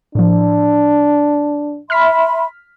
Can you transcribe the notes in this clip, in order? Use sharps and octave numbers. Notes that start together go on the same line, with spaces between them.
A2 F3 D4
E5 B5 C6 F6 B6